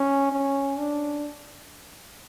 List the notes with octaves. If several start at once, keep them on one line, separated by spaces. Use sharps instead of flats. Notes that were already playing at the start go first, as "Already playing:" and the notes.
Already playing: C#4
C#4
D4